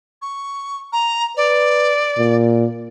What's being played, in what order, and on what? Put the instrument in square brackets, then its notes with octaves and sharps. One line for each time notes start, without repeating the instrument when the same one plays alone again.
[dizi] C#6
A#5
[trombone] B4 [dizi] D5
[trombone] A#2